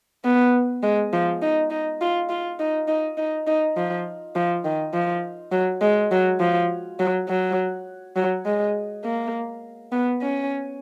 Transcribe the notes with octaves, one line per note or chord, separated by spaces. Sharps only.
B3
G#3
F3
D#4
D#4
F4
F4
D#4
D#4
D#4
D#4
F3
F3
D#3
F3
F#3
G#3
F#3
F3
F#3
F#3
F#3
G#3
A#3
B3
C#4